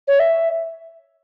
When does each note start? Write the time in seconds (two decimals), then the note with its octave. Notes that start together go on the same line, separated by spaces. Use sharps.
0.07 C#5
0.19 E5